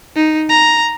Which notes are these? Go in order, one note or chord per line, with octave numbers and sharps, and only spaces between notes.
D#4
A#5